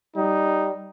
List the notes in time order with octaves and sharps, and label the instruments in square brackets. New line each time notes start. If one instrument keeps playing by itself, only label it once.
[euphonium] G3 [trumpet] D#4